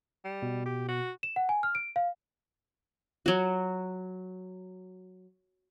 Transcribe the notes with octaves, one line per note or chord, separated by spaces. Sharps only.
G3
B2
G4
F#4
E7
F#5
G#5
F6
D7
F5
F#3 F#4